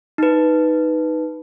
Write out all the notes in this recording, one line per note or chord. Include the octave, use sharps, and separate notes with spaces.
D#4 B4